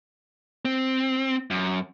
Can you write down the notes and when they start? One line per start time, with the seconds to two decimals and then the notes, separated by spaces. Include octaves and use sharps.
0.65 C4
1.51 F#2